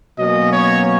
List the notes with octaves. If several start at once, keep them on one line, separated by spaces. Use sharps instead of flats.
B2 F#3 A#3 C#4 D#5
C#5